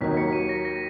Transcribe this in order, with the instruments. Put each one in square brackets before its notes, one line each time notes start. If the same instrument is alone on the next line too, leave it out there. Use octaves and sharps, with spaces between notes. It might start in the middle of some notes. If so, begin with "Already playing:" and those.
[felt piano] D#2 D#3 F#3 A#3 D#4 [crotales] B6
[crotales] B6 C#7
C#7 D#7
A#6
A#6